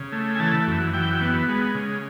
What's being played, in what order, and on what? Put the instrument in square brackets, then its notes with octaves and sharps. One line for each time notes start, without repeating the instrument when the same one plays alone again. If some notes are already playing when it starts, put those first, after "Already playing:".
Already playing: [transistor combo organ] C#3
A3
G#5
E3 A5
F#2
E3 G5
B3
G#3
C#3